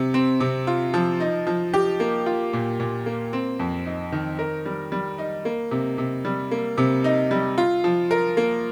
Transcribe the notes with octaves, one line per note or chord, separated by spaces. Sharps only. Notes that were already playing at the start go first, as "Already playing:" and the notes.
Already playing: C3
C4
C3
F4
F3
D#4
F3
G4
A#3
F4
A#2
A#2
A#3
C4
F2
D#4
D#3
A#4
G3
G3
D#4
A#3
C3
C3
G3
A#3
C3
D#4
G3
F4
F3
A#4
A#3